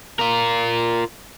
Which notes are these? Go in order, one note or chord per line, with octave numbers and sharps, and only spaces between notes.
F4 A#4